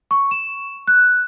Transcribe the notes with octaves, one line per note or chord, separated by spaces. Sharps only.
C#6
E7
F#6